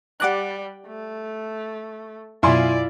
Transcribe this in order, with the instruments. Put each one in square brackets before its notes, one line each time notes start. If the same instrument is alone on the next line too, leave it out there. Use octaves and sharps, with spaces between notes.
[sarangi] G3 [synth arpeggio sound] F#5 D6 F#6
[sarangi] A3
[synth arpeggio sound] F#2 B2 [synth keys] E4 F4 [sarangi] D5 [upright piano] G#5 C6